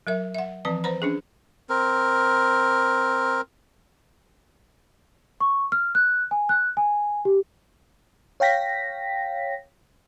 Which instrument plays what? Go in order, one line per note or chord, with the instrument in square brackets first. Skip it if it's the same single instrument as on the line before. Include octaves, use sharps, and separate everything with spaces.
[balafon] F#3 A#4 E5
E5 F#5
E3 F3 C4 B4 A5
B4 C5 A#5 B5
C#4 D4 G#4
[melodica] C4 A#4
[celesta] C#6
F6
F#6
G#5
F#6
G#5
G4
[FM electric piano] C#5 F5 G5 A#6 B6